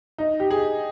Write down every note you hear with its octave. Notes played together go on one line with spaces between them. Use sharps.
D#4
G4
G#4